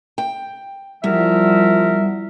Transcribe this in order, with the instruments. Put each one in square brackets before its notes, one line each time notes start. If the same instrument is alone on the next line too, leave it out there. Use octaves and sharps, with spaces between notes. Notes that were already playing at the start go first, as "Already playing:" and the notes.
[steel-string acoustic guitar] G5
[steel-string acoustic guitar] E2 [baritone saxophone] F3 [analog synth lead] G3 [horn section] F#4 A#4 E5